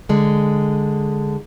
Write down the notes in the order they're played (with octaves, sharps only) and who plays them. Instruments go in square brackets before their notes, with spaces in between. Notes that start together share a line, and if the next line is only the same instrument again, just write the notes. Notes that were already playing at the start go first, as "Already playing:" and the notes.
[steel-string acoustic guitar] D3 G#3